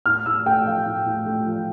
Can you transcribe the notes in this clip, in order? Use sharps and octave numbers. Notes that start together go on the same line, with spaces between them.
A2 F6
A2 E6
A3 G5
F3 F5
A2
A2
A3
F3